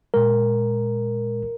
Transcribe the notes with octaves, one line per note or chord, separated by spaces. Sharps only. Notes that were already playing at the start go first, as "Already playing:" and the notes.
A#2 G#3 A#4